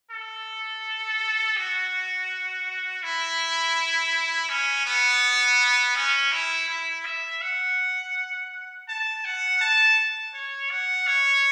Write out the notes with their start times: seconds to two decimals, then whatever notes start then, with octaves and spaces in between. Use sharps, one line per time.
0.11 A4
1.57 F#4
3.03 E4
4.49 C#4
4.86 B3
5.96 C#4
6.32 E4
6.69 E4
7.06 E5
7.42 F#5
8.89 A5
9.25 F#5
9.61 A5
10.34 C#5
10.71 F#5
11.07 C#5